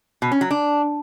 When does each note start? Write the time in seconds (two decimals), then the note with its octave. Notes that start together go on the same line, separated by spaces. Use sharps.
0.22 B2
0.31 C#4
0.41 F#3
0.50 D4